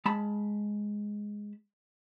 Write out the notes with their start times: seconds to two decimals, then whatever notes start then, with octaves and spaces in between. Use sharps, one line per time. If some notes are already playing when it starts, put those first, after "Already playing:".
0.06 G#3 A5 B5